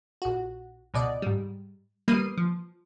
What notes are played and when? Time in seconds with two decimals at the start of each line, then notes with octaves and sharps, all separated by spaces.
0.22 A#1 F#4
0.94 C#2 B2 D5 D#5
1.22 G#2 G3
2.08 G3 A#3 B4 D#6 C7 D#7
2.37 F3